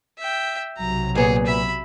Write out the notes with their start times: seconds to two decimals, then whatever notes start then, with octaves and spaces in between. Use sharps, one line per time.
0.18 E5 G5
0.77 B1 C3 F#3 A#5
1.15 A#2 B3 G#4 C#5
1.46 E5 B5